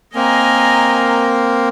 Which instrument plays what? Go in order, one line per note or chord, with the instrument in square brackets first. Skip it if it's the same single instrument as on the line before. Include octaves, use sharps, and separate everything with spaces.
[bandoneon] A#3 C4 A#4 [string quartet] D#5 G#5 A#5